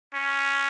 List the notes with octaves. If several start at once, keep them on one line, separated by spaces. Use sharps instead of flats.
C#4